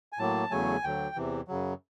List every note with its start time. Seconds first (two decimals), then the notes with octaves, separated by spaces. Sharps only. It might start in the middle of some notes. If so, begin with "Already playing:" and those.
0.13 G#5
0.19 A2 F#3 A#3 A5
0.51 E2 C#3 F#3 A3 G#5
0.83 D2 D3 F#3 G5
1.15 E2 C3 E3
1.48 F#2 C#3 F#3